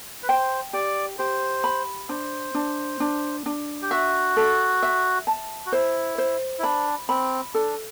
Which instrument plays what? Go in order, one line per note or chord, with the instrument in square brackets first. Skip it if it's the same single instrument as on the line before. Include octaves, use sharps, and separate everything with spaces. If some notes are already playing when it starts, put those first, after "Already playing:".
[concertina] B4
[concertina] C5 [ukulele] G5
[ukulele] G4 [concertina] D5
[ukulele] G4 [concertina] C5
[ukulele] B5
[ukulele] D4 [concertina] C5
[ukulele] D4
D4
D4
[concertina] G4
[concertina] F#4 [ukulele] E5
[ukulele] A4
E5
A5
[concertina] F#4
[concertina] E4 [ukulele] C5
[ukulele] C5
[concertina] E4
[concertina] D4 [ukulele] B5
[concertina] C4 [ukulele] B5
[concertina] D4 [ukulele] A4